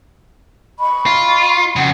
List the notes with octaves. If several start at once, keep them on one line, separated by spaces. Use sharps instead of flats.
D#5 B5 C#6
F4
F2 C#3 F#5